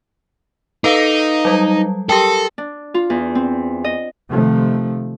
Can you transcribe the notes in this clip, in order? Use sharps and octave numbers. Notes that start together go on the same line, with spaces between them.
D#4 A4 B4 F5
F#3 G3
G4 A4 A#4 G5
D4
F4
E2
C4
D#5
C3 D#3 F3 A3